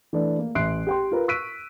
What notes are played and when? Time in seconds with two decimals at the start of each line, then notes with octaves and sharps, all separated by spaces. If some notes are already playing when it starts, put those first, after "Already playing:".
0.13 E3 A3 D4
0.39 A#3
0.55 A1 E5 C6 F#6 C7 D7
0.87 G4 G5 C6
1.12 F4 A#4 B4
1.28 C#6 E6 F#6 B6 D7 D#7